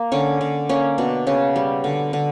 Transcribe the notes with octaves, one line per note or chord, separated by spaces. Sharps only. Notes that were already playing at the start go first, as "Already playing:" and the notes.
Already playing: A#3
D3 C#4
D3
A#3 C#4
B2 D4
C#3 C#4
G3
D3
D3